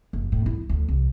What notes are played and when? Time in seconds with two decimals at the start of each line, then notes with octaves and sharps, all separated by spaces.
0.13 F#1
0.32 A2
0.46 E4
0.69 D2
0.89 C2